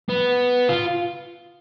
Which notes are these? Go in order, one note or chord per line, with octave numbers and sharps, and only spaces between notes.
B3
F4